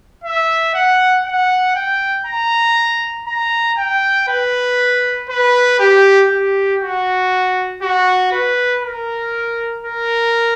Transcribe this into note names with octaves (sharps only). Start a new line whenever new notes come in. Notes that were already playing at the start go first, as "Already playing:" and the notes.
E5
F#5
F#5
G5
A#5
A#5
G5
B4
B4
G4
G4
F#4
F#4
B4
A#4
A#4